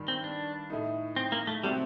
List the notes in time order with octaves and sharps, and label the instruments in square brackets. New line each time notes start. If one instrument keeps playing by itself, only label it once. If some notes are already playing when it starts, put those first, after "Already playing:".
Already playing: [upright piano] G2 D#3 G3
[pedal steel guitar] C4
D4
[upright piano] A2 A3 D#4
[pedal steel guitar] C4
A#3
A3
[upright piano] C3 F#3 A3 C4 F#4 [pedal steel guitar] G3